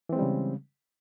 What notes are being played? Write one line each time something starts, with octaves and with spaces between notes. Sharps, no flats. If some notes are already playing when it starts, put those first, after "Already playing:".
C#3 E3 G3 G#3 C4